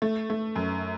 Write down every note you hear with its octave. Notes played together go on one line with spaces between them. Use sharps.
A3
A3
F#2